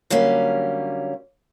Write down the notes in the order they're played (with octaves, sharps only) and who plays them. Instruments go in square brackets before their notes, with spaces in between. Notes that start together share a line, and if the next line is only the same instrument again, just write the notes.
[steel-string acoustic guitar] D3 F#3 G3 A#3 C#4